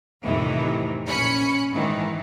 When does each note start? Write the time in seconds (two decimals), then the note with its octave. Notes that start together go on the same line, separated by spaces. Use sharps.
0.23 F2 A2 C3 D#3 E3
1.06 A#1 C#4 B5 C#7
1.72 G#2 D#3 E3